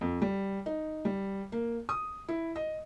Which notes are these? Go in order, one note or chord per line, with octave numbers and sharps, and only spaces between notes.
F2
G3
D#4
G3
A#3
D#6
E4
D#5